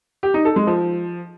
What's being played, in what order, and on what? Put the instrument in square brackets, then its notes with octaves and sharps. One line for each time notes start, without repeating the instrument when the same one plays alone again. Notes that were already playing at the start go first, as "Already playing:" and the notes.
[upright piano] G4
D#4
A4
G#3
F3